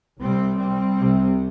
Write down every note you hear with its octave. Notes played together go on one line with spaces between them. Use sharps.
C2 C3 G3 C4
G3 C4
C2 C3